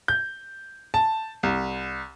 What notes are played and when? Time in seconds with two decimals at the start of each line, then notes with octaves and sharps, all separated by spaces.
0.08 G6
0.94 A5
1.43 C2